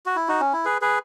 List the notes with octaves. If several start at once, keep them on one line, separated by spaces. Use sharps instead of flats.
F#4
E4
D#4 F#4
C#4
E4
G#4 B4
G#4 B4